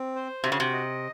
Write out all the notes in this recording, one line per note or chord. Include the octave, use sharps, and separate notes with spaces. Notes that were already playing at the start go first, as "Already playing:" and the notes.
Already playing: C4
C5
C3 F#4
C#3
C3
D#5